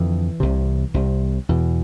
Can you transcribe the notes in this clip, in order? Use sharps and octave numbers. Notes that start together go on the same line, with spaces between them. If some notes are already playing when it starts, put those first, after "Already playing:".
Already playing: F2 D3 E3
C2 C3
C2 C3
E2 B2